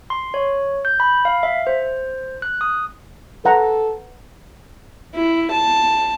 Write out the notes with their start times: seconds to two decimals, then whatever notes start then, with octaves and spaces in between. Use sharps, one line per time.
0.10 C6
0.34 C#5
0.85 G6
1.00 B5
1.25 F5
1.43 E5
1.67 C5
2.42 F#6
2.61 D#6
3.45 A4 B4 F#5 A#5
5.15 E4
5.51 A5